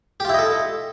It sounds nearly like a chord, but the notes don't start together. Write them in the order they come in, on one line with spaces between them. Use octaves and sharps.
G4 F4 E4 D#5 A4